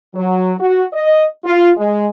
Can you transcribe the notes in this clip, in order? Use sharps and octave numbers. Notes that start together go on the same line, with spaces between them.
F#3
F#4
D#5
F4
G#3